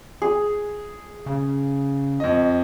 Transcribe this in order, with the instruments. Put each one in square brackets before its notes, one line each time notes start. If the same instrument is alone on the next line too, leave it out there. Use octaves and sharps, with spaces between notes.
[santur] G#4
[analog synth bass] C#3
[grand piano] F2 D#5